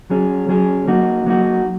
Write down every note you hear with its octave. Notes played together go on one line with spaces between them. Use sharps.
F#3 C#4 G#4
F#3 C#4 G#4
F#3 A#3 D#4 F#4
F#3 A#3 D#4 F#4